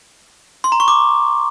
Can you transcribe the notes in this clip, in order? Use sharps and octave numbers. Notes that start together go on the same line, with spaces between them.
C6
A#5
C#6
D6